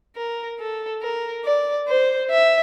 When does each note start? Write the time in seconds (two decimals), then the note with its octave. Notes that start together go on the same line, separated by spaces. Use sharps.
0.16 A#4
0.60 A4
1.02 A#4
1.45 D5
1.88 C5
2.30 E5